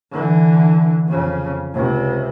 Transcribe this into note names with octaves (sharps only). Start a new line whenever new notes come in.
D3 E3
F2 C#3
C#2 C3